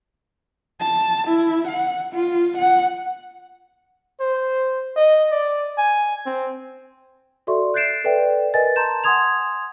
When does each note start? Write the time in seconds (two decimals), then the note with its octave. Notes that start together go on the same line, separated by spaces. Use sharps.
0.80 A5
1.28 E4
1.68 F#5
2.13 F4
2.58 F#5
4.20 C5
4.97 D#5
5.32 D5
5.78 G#5
6.26 C4
7.47 F#4 A4 D5 E5 C6 C#6
7.74 F#6 G6 A6 C7 D7 E7
8.04 A4 B4 D5 E5 G5
8.54 A#4 B4 D#5 G#5 A6
8.76 A5 A#5 C6 G6 E7
9.04 F#5 G#5 C6 D#6 G#6 F7